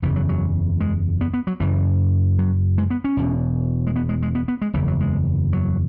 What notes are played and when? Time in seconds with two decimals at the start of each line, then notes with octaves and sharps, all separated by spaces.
0.02 F#1 E2 C#3 E3
0.16 F#3
0.29 F#3
0.81 G#3
1.21 B3
1.34 B3
1.47 F#3
1.60 F#1 F#2 C#3 E3
2.38 F#3
2.78 G#3
2.90 B3
3.04 C#4
3.17 E1 E2 B2
3.87 G#3
3.96 B3
4.09 G#3
4.22 G#3
4.35 B3
4.48 B3
4.62 G#3
4.73 F#1 E2 C#3 E3
4.88 F#3
5.01 G#3
5.53 F#3